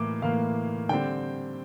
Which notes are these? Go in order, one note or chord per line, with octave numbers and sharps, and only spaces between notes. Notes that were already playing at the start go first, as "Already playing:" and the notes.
Already playing: A2 E3 A#3 D6
A2 E3 A#3 F5
D3 G3 C4 G5